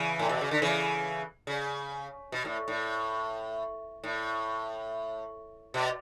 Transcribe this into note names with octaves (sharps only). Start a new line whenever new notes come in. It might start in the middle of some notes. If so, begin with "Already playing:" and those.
Already playing: C#3 E3
A2
B2
C#3
D3
C#3 E3
C#3
B2
A2
A2
A2
B2